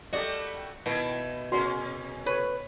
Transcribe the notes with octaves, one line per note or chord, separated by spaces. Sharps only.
G3 A3 A#3 F#4 G4 D5 D#5
B2 D#3 E4
C3 C#4 F#4 A#4 C6
B4 C#5